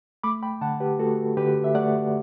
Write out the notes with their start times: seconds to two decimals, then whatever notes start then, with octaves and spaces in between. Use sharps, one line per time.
0.23 A3 B5 D6
0.43 G5 B5
0.61 D3 F#5 A5
0.80 G4 B4
0.99 A3 F#4 A4
1.37 D3 G4 B4
1.64 E5
1.75 A3 D5 F#5